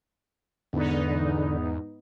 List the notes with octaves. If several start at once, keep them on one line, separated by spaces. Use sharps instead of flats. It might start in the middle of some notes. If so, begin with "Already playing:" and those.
E2 G#2 D3 B3 D#4